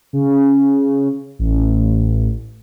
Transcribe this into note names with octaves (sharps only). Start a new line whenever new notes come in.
C#3
A1